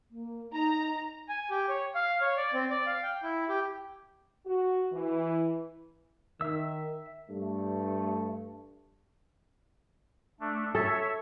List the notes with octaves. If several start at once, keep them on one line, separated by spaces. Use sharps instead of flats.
A#3
D#4 A#5
G#5
G4
C#5
F5
C#5
D5
C4
D5
F5
G5
E4
G4
F#4
E3
D#3 E5 E6
G2 A3
A3 D4
A4 C#5 E5